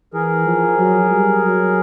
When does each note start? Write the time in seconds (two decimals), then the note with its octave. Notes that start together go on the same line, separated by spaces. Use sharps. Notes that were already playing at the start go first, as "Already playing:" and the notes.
0.13 E3 G#4 A#4
0.46 F3
0.78 F#3
1.11 G3
1.43 F#3